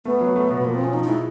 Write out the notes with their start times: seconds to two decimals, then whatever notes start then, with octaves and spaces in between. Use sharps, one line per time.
0.05 A3 B3
0.21 F#3
0.36 A3
0.50 B2
0.64 F3 A#3
0.75 F3 C4
0.84 C#4
0.94 F3 D#4
1.04 D#4
1.08 G#3 E4